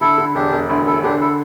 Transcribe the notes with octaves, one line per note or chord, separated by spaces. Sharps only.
D3 E4 A4
D3
E1 D4 G4
E1
D2 E4
E1 E4 A4
D3 D4 G4
E4 A4